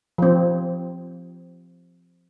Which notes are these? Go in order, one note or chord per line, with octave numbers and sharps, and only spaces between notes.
F3 C4